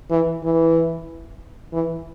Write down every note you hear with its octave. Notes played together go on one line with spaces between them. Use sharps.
E3
E3
E3